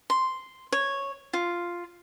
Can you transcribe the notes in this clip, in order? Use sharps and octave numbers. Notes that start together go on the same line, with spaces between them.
C6
C#5
F4